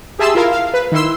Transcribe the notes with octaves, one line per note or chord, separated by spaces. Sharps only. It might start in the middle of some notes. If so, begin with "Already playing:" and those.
G4 G#4 E5 A5 C6 E6
E4 F4 A#4 F5
F5
B4
D#3 E4 C6 E6